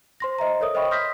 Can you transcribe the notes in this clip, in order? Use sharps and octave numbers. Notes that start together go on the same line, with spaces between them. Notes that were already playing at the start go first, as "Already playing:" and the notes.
C5 C6 A#6
C5 D#5 E5 A#5
A4 A#4 C#5 E5 D#6
C5 D#5 E5 G5 B5 C#6
C6 D#6 F6 G6 A#6 B6